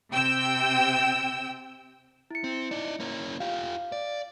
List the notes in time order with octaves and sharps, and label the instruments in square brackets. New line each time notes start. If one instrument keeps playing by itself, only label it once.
[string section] C3 G5 E6
[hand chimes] E4 C#7
[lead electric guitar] C4
D#4 D5
A#3 C#4
[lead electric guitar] F4 G4 [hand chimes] F5
[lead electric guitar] D5